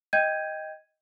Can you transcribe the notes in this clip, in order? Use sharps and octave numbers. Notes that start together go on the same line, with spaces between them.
D#5 G5 G6 G#6 D#7